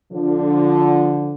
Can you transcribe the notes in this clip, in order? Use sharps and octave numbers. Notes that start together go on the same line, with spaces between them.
D3 F3